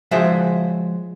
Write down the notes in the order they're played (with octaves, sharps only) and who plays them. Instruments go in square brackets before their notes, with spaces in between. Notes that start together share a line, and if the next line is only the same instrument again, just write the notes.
[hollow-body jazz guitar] F3 G#3 F#4 C5 E5